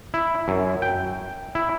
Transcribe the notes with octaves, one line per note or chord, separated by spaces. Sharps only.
E4
F#2
G5
E4